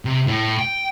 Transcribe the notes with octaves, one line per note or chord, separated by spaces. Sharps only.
C3
A2
G5